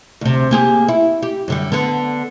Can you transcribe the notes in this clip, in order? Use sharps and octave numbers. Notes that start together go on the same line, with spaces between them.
D2 C3
A#3 G4 G#4
E4
G4
F#2 D3 G3
D3 B3